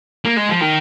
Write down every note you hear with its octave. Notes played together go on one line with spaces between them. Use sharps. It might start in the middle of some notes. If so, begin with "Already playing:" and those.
A#3
G#3
F3
D#3